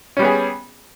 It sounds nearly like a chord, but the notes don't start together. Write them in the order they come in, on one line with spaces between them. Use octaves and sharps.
C#4 G3 B3 G#4